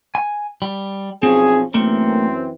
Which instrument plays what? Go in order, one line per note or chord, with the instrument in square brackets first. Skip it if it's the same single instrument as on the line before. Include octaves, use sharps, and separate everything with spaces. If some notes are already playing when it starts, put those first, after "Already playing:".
[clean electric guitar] G#5
G3
[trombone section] B1 F3 G#4 [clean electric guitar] C4 C#4
[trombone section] F#2 E3 C4 [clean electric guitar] A3 A#3 A#4